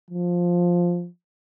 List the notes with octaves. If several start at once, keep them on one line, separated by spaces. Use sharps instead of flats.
F3